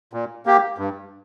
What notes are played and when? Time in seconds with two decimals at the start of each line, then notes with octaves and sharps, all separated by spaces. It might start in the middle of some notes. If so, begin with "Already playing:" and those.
0.13 A#2
0.46 A#3 G4
0.78 G2